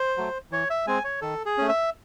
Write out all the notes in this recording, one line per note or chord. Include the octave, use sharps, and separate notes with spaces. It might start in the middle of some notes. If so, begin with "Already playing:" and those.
Already playing: C5
F#3 A3
E3 C#5
E5
G#3 C4 G#5
C#5
D#3 A4
G#4
A3 C#4
E5